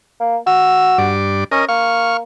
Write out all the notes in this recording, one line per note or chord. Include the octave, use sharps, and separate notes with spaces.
A#3
F#4 E6
G2 D5
C#4 A#4 D#5
A#3 C#6 F6